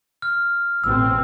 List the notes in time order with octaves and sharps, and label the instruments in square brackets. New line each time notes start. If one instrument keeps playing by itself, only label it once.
[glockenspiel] F6
[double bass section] A1 B2 C4 [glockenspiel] E6